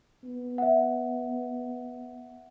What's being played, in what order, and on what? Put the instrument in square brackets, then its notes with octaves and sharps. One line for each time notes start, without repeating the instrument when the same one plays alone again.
[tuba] B3
[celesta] E5 F#5